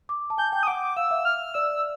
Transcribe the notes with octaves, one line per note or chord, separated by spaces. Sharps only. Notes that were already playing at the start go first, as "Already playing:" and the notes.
D6
A5
G#5 G6
G5
D#6
F#5 D6
F5 E6
E5
F6
D5 E6